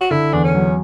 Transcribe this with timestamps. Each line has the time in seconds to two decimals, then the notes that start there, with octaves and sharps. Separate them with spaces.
0.01 F#4
0.11 D3 E4
0.33 E2 D4
0.44 C#4
0.55 F#3